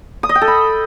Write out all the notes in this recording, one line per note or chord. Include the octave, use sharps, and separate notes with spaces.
D#6
D#5
G5
A4
B5